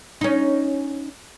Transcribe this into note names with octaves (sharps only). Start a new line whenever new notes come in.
C#4 D#4